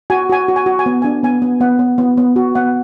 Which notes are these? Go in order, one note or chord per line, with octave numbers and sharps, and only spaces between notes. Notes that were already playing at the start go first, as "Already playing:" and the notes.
F#4 G#5
F#4 G#5
F#4
G#5
F#4
G#5
B3
D4 G#5
B3 G#5
B3
B3 F#5
B3
B3
B3
F#4
B3 F#5